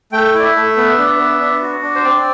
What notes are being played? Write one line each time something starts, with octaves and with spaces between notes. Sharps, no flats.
A3 G5
E4 D5
E5
A3
B3
D4
B3
D4
F#4
D4
C5
C4 D5